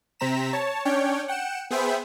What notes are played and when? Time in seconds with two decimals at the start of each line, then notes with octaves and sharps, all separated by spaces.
0.20 C3 C4 A#5 B6 E7
0.53 C#5 A5
0.85 C#4 D4 C#5 G5
1.28 F#5 G5 C#7 E7
1.71 B3 G#4 C5 E5 G5 B5